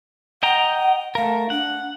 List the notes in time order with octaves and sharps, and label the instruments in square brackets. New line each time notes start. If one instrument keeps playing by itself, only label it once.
[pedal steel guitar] D#5 G5 A#5 [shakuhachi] F#5
[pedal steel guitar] A3 A#4 [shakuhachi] F5
[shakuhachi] D4 [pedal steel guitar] F#5